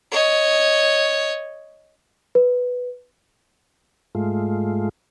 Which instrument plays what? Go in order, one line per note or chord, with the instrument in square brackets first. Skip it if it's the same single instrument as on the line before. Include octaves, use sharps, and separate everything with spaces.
[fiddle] C#5 D#5
[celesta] B4
[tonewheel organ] G#2 G#3 A3 F4